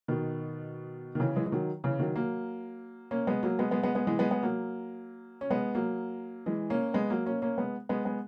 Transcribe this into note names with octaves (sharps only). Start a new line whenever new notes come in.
B2 D#3
D#3
C#3 E3
E3 G#3
E3
D#3 F#3
C#3 E3
D#3 F#3
F#3 A#3
A#3 C#4
G#3 B3
F#3 A#3
G#3 B3
G#3 B3
G#3 B3
G#3 B3
E3 G#3
G#3 B3
G#3 B3
F#3 A#3
C#4
G#3 B3
F#3 A#3
E3 G#3
A#3 C#4
G#3 B3
F#3 A#3
A#3 C#4
A#3 C#4
G#3 B3
G#3 B3
G#3 B3